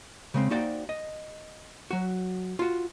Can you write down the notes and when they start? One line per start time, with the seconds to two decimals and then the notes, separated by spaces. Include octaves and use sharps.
0.34 C#3 G#3 C4
0.50 A#3 D#4 F#4 C5 D5 G5
0.89 D#5
1.91 F#3 F#4
2.59 F4 F#4